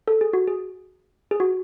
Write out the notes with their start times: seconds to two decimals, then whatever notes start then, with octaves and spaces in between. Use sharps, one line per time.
0.08 A4
0.21 G#4
0.33 F#4
0.47 G#4
1.31 G#4
1.40 F#4